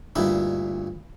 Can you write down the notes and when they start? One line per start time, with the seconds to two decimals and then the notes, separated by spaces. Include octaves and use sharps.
0.16 D2 G2 A#2 D#4 E4